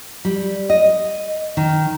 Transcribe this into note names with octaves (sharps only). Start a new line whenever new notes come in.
G3
D#5
D#3